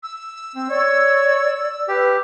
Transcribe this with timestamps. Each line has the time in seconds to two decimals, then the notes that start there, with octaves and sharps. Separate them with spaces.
0.03 E6
0.55 C4
0.69 C#5 D5
1.88 G4 B4